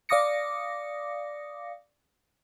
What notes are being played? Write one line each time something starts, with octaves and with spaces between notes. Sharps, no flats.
D5 F5 D6 D#6 A#6 C#7